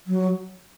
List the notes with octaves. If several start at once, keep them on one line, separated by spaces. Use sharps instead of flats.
F#3